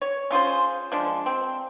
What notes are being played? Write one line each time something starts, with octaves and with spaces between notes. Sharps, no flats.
C#5
C#4 F4 G#4 C5
F3 G#3 D4
C4